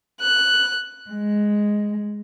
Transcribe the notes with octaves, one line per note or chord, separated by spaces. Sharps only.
F#6
G#3